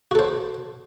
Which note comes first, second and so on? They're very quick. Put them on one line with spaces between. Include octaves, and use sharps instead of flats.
F#4 A4 C5